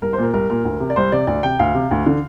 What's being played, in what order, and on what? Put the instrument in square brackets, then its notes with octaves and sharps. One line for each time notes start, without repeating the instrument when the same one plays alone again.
[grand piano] C2 A#4
C5
A#2 A#4
C2 A#4
A#2 A#4
D2
C3
D5
C2 C5
C3 D5
D2 D5
C3 G5
D2 F5
C3
D2
D3